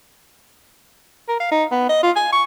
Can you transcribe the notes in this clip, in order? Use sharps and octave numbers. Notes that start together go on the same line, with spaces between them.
A#4
F5
D#4
B3
D#5
F4
G#5
C#6